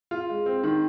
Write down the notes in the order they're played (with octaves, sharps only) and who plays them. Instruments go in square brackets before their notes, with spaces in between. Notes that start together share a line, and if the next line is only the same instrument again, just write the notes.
[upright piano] F4
G#3
C4
D#3